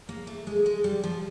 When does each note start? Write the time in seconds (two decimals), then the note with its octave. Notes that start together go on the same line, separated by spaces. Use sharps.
0.09 A#3
0.27 A3
0.47 G#3
0.66 G#3
0.84 G3
1.04 F3